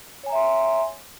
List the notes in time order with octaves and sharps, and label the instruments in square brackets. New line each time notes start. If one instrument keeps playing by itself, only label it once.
[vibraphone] C#5
G#5
A#5
E5
C6